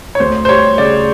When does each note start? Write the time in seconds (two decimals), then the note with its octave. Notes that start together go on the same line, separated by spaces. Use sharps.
0.15 C#5
0.20 D2 C5
0.45 C5
0.49 G3 C#5
0.78 C#3 D5